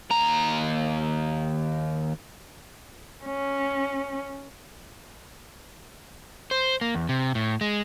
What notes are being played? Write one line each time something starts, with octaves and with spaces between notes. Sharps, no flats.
D#2 A#5
C#4
C5
A#3
E2
C3
A2
G#3